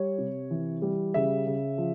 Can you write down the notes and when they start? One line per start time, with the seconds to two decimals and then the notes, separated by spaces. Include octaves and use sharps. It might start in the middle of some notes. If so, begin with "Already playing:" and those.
Already playing: G3 C#5
0.18 C3
0.51 E3
0.82 G3
1.14 C#3 E5
1.47 C#3
1.78 F3